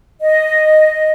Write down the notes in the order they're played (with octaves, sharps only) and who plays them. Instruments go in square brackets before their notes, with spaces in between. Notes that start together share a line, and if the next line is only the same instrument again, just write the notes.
[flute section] D#5